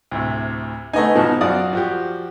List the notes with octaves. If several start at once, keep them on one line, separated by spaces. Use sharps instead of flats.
D2 A2 C3
A3 B3 D#4 D#5 G#5
G#2 B2 F3
F#2 F4 F#4 D5 D#6
F3 F#4 G4